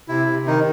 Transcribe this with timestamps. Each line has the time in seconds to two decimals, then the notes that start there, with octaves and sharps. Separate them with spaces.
0.08 C3 E4
0.28 C3
0.46 D#3 D#4